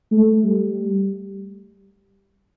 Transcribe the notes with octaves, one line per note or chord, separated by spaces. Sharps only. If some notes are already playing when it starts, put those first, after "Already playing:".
A3
G3